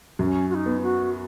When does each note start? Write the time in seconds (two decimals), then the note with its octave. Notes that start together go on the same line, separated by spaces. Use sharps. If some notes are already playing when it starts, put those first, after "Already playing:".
0.19 F#2 C#4
0.50 F#4
0.55 D#4
0.66 B3
0.82 F#4